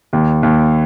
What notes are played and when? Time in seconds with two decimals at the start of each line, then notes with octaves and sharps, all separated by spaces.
0.13 D#2
0.43 D#2